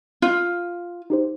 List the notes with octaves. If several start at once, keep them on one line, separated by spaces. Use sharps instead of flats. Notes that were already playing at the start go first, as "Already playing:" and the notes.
F4
D#4 G4 C5